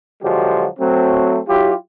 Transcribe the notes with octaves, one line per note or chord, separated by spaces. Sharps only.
D3 F3 F#3 G#3 F#4 G4
F#3 A3 C4
F#3 E4 F4 G4